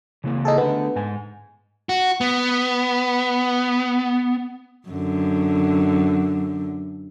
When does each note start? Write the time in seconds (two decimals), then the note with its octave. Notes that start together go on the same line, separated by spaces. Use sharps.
0.24 C#3 E3 A#3
0.45 D#4 G#4 A4
0.58 D3 A3 B3
0.96 G#2 G#5
1.89 F#4
2.21 B3
4.89 F#2 D3